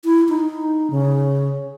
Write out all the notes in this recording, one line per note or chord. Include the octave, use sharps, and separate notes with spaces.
E4
D#4
C#3